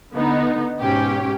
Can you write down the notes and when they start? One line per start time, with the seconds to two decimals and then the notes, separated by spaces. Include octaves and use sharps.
0.13 D3 B3 D#4
0.81 G#2 B2 C#4 G4 G5